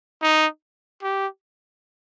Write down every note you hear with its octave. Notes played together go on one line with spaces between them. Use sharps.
D#4
G4